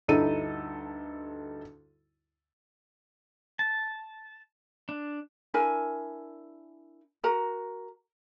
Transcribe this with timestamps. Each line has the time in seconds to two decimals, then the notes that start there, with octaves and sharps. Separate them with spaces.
0.08 D2 G2 D#4 E4 A4 D#7
3.59 A5
4.89 D4
5.54 D4 E4 A#4 G#5
7.24 F#4 A#4 A#5